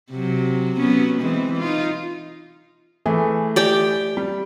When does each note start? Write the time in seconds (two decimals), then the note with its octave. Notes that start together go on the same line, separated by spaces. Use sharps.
0.10 C3 F#3
0.77 F#3 B3 C#4
1.21 E3 G#3 C4
1.59 D#4 F4
3.06 E3 A3 G#4
3.56 G4 D5 G5
4.17 G3